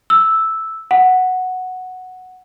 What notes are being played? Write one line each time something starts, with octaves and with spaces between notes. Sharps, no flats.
E6
F#5